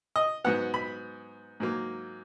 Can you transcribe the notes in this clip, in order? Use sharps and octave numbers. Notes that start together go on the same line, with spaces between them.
D#5
G#2 F#3 B3 F#5
B5
G#2 F#3 A#3